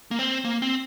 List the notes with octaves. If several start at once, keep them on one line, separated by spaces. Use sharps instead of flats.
A#3
C4
A#3
C4